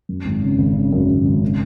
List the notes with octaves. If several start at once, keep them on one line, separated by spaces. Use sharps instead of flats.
F#2
G#1
C#3
G#1
C#3
F#2
G#1
G#1
C#3